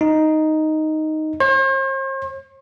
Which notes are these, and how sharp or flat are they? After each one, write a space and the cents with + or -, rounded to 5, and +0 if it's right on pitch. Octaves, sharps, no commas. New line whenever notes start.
D#4 +0
C5 +45